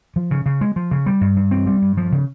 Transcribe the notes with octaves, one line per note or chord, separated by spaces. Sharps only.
F3
C#3
C#3
G#3
F3
C#3
G3
G2
G2
C4
G3
G2
F3
C#3